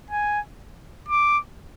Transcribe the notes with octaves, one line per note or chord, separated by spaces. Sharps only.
G#5
D6